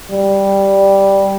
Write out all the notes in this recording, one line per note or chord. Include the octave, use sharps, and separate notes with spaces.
G3